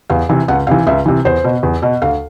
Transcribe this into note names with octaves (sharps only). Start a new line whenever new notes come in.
E2 F5
C3 E3
C#2 F#5
C3 E3 F5
C#2 E5
C3 E3
E2 C5
B2
E2
B2
D2 F5